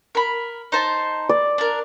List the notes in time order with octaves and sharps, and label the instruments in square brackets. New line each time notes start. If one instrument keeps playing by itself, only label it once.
[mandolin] A#4 B5
D#4 C5 A5
[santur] D5
[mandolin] D4 A#4